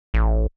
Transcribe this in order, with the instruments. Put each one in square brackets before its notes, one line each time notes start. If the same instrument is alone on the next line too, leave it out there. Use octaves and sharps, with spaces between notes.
[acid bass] A1